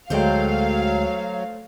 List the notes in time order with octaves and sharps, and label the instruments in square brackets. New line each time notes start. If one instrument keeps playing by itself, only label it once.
[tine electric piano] D2 G#3 G5 [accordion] F#3 [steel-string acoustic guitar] A3 A4 C5 [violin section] F5